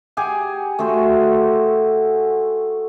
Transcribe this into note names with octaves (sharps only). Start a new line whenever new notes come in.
G4 G#4 F#5 G#5
A3 F#4 G#4 C5